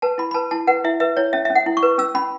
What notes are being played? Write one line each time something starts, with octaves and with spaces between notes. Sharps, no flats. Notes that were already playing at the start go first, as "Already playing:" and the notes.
B4 A5
E4 B5
B5
B4 A5
E4 A5
B4 F#5
E4 E5
B4 E5
E4 C#5
C#4 E5
C#4 E5
F#5
E4
C#6
B4
C#4 E6
C#4 B5